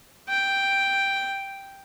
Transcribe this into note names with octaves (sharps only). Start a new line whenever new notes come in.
G5